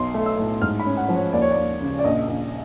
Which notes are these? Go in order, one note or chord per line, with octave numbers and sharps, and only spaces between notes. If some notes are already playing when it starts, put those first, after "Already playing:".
Already playing: B1 C6
A3
E6
A2
G#2 F6
B5
C#4
F#5
F3
C#5
D#2 D5
C#5
D5
D#2
C#3
D5
A#1 D#5
A#1